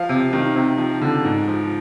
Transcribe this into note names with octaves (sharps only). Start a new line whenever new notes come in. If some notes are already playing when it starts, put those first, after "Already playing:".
Already playing: F3 F5
C3
D#3
C3
F3
D3
G#2
F3